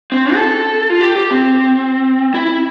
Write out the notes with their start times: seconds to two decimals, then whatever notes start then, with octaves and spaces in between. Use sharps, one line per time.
0.12 C4
0.34 A4
0.90 F4
1.01 G4
1.16 G4
1.31 C4
2.34 E4